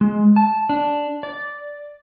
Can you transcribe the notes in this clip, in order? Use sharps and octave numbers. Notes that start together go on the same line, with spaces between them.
G#3
A5
D4
D5